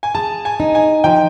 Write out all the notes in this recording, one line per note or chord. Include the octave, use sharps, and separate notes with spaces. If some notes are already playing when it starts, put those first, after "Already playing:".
G#5
G#4 A5
G#5
D#4
G#5
F3 G5